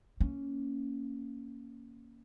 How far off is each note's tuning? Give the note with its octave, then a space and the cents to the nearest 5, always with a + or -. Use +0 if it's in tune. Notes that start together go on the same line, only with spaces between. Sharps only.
A#3 +0 C#4 +0